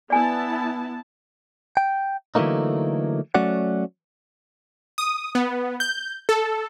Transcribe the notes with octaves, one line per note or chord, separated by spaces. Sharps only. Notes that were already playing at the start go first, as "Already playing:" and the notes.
B3 E4 D5 G#5 A5
G5
D3 E3 F#3 A3 A#3 D#4
F#3 A3 C#4 F#4 D5 F#5
D#6
B3
G6
A4